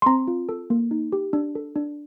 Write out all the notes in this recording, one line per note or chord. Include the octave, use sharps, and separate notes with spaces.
C6
C4 A#5
F4
A4
A#3
D#4
G4
D4
A4
D4